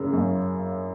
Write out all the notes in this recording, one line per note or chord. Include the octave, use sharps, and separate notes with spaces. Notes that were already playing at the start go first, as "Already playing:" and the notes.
Already playing: F#2 C#3 C#4
F#2